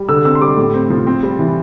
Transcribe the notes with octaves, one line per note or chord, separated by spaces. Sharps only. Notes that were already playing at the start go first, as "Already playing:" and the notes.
Already playing: G3
D3 E6
C4 E6
C6
G3 D6
A2
C4
F3
C4
G3
E3